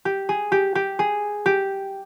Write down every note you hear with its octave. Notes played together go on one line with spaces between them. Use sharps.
G4
G#4
G4
G4
G#4
G4